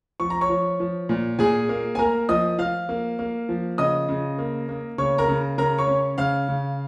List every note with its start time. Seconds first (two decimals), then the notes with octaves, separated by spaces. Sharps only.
0.20 F3 C#6
0.30 A#5
0.41 C#5 C#6
0.50 F3
0.80 F3
1.09 A#2
1.39 A#2 G#4 G#5
1.69 A#3
1.95 G#5
1.99 A#3 A#4 A#5
2.29 F3 D#5 D#6
2.59 F3 F5 F6
2.89 A#3
3.19 A#3
3.49 F3
3.78 C#3 D#5 D#6
4.09 C#3
4.39 A#3
4.69 A#3
4.98 C#3 C#5 C#6
5.18 A#4 A#5
5.28 C#3
5.58 C#3 A#4 A#5
5.78 C#5 C#6
5.87 C#4
6.18 C#3 F5 F6
6.48 C#3